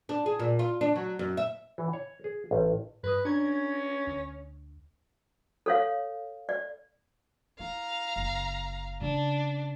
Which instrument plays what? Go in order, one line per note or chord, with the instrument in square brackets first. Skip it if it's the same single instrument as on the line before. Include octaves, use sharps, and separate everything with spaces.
[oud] D4
G#4
A#2
F4
D4
F#3
F#2
E5
[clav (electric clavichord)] E3
C#5
G#4
A1
[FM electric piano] G2 D#6 [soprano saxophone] B4
[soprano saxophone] C#4 [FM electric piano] D4 A#5 G#6
[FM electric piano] D2
[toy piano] A4 C#5 F5
D5
[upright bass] E4 [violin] F5 A#5
[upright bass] F#1
[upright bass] C#3 [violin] D4